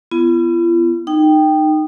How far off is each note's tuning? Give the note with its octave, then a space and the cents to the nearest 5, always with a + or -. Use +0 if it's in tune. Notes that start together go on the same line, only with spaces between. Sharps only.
B3 +15 F4 -45
D#4 -20 G5 +0